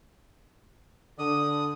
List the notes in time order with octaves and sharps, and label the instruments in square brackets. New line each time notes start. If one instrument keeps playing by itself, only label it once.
[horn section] D3 [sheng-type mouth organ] D#6